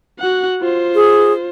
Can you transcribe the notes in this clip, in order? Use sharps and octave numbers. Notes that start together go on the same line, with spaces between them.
F#4 F#5
F4 C5
G#4